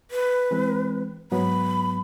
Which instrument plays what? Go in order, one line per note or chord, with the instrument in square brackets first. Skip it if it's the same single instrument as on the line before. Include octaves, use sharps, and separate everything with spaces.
[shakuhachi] B4
[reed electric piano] E3 G#3 C4
[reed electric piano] G#2 F#3 B3 [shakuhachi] B5